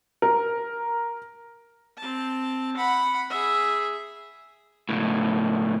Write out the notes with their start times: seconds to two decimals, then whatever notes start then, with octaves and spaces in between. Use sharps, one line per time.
0.22 A#4
1.98 C4 A5
2.77 F#5 B5
3.30 G#4 E5
4.89 C#2 A2